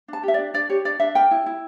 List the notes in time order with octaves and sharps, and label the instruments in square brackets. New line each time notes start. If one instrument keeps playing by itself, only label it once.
[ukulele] D4 A5
G4 E5
D4 D5
D4 D5
G4 C#5
D4 D5
D4 E5
A#4 G5
E4
E4